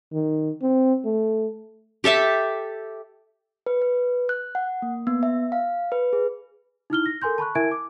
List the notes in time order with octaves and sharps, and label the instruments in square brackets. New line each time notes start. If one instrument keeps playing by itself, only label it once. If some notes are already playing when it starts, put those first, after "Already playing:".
[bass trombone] D#3
C4
A3
[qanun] G4 A4 E5 A5
[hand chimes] B4
B4
F#6
F#5
A#3
B3
E5
F5
B4
G#4
[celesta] D#4 E4 F6 G7
A#6
A4 A#4 G#5 C6 G6
A5 B5 C#6 F#6
E4 A#4 E5 G#5 G#6 D7
D6